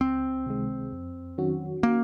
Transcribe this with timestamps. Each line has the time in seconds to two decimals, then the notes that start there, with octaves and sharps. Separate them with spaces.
0.01 C#2 C4
0.46 C3 D#3 G#3
0.92 F2
1.38 D#3 F#3 C#4 F#4
1.83 A#3